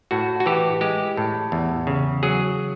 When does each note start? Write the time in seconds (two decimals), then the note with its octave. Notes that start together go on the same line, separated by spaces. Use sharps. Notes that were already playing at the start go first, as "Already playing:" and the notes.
0.11 A2 F#4
0.40 F#4
0.46 E3 G4
0.81 G#3 G4
1.17 A2
1.52 E2
1.87 C#3
2.23 F#3 G#4